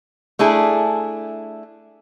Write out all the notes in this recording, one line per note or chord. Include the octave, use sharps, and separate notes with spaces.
A3 D4 E4 G#4